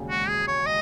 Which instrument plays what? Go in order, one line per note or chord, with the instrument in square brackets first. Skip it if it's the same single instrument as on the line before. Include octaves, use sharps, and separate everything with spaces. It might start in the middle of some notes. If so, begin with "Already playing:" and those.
Already playing: [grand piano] E1 D#2 C#3 G#3
[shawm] F#4
G#4
C#5
D#5